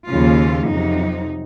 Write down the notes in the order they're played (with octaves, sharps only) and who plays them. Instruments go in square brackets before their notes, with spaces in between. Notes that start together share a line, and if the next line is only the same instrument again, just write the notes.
[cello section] D#2 C#3 F3 F4
F2 C3 F#3 D#4